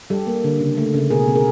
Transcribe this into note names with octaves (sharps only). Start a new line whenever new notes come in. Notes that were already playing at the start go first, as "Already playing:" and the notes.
G3 G4 A4
A#3
D3
C#3
A3
C#3
B2 G#4 A#4
B2
G#4 A#4